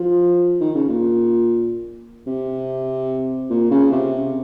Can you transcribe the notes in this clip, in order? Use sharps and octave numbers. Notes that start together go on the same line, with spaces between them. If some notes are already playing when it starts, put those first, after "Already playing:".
Already playing: F3
D#3
C#3
A#2
C3
A#2
C#3
C3